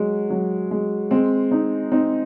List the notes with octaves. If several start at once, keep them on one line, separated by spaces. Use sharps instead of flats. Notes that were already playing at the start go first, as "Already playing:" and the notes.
Already playing: F#3 G#3
F#3
G#3
G#3 C4
C4 D#4
C4 D#4